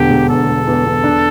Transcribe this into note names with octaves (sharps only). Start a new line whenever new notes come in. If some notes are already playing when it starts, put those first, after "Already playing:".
Already playing: E1 E2 D3 G4
E1
E2 A4
E1
E2
E2
D4